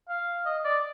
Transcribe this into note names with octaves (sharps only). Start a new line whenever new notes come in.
F5
D#5
D5